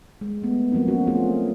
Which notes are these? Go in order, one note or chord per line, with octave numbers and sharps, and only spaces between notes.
G#3
A3 B3
F3 F#3 A#3 C4 D#4
C#4 F#4
A3 A#3 C4 F4 G#4